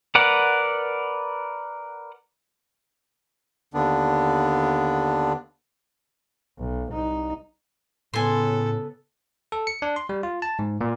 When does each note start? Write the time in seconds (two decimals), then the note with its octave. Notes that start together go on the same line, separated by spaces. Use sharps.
0.15 A#4 B4 D5 F#5
3.74 D#2 D3 B3 D4
6.59 B1
6.92 C2 D#4
8.14 A2 C#3 B3 A4 G#5 C6
9.52 A4
9.67 C#7
9.82 D4
9.96 C6
10.09 G3
10.23 F4
10.42 A5
10.59 G#2
10.81 A#2